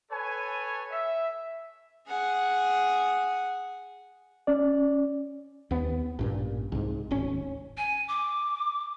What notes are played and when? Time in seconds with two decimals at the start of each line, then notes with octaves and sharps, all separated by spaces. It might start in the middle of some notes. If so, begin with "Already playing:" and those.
0.11 A4 B4 C#5 G#5
0.91 E5
2.07 G#4 F#5
4.47 C#4 D5
5.71 D#2 B3
6.19 A1 G2 A#2
6.72 C2 G#2
7.11 D1 G#1 C#4
7.77 G#5
8.08 D6